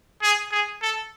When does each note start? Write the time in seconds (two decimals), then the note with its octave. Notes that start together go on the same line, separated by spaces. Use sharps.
0.22 G#4
0.52 G#4
0.82 A4